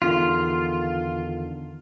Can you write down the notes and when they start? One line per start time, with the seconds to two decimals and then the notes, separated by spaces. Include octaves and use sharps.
0.02 E2 D3 D#3 F4